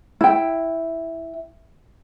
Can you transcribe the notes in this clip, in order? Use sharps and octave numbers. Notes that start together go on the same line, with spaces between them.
E4 G5